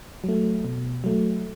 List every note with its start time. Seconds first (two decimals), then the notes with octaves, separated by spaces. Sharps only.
0.24 F#3 A3
0.65 B2
1.04 F#3 A3